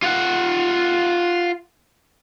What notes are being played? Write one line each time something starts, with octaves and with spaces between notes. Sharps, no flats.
F4 F#5